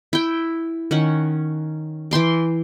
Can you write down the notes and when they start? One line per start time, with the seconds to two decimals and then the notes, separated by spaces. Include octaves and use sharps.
0.13 E4 G5
0.91 D#3 C#4 F#5
2.11 E3 G5 C6 D6